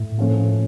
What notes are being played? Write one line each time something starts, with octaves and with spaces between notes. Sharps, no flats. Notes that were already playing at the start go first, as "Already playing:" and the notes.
Already playing: A2
A#2 F3 A3 C#4